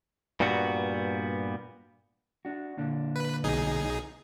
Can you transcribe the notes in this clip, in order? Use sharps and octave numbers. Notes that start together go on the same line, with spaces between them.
G2 A#2 G3 B3 F#4
D4 F#4
A#2 D3 D4
B4
B1 D#4 G#4